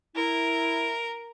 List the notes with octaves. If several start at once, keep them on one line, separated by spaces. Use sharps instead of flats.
E4 A#4